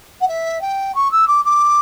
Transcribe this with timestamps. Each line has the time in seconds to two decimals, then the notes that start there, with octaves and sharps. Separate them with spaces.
0.21 F#5
0.28 E5
0.62 G5
0.95 C#6
1.12 E6
1.28 D6
1.45 D6